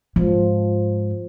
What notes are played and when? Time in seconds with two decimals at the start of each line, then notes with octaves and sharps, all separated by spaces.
0.16 G#2 F3